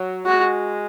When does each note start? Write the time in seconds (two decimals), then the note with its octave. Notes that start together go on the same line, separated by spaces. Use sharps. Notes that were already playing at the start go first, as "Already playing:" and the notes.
Already playing: F#3
0.26 G#3 F#4